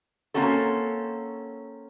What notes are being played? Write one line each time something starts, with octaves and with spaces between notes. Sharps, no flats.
A#3 C4 C#4 F#4 A4